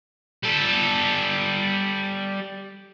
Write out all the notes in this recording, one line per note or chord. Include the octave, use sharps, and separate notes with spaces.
G3 A4